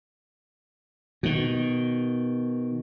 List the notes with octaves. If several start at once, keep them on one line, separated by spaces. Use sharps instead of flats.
B2 D#3